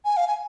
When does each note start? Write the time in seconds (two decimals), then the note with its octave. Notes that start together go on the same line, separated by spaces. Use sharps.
0.05 G#5
0.17 F5
0.27 G#5